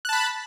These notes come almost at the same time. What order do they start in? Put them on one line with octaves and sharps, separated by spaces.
F#6 A5 B5